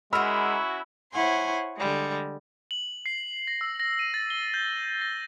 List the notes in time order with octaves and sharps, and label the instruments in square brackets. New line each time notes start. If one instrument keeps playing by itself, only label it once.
[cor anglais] G#3 [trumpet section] C#4 E4 F#4 [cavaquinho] A#4 F#5 [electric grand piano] B5 E6
[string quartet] E4 C5 C#5 F#5 G#5 C6
D3 G3 G#3
[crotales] F#7
C7
A#6
E6
A#6
D#7
A6
G7
G6
A#6